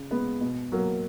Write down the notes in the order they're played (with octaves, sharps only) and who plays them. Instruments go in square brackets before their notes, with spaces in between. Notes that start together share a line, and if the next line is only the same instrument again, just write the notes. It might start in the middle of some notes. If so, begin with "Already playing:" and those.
Already playing: [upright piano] C#3
G#3 B3
B2
F#3 A#3